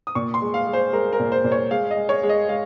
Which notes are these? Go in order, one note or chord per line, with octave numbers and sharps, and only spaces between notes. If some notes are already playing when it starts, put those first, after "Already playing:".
D#6
A#2 C#6
C6
G#3
F5
G#3
C5
G#3 A#4
A#4
A#2
C5
A#2
C#5
G#3 F5
D#5
G#3
C#5
G#3
D#5
G#3 F5